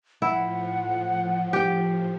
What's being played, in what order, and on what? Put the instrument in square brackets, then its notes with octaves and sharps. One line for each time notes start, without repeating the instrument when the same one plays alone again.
[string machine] A2 F3 [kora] E4 [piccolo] F#5
[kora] G4 G5